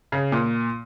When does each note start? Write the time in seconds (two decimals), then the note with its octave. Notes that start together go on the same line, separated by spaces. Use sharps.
0.12 C#3
0.32 A#2